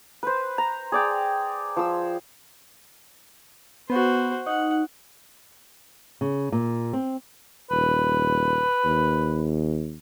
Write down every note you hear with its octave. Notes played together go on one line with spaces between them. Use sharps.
B4 C5
A#5
G#4 D5 G5
F3 E6
B3 F#4 C5
D#4 F#5
C#3
A#2
C4
D#1 B4
D#2